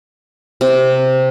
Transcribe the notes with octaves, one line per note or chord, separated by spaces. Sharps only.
C3